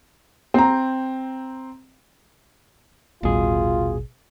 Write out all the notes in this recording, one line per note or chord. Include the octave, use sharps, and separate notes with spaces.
C4 A#5
D#1 A1 B2 G3 F4 G#4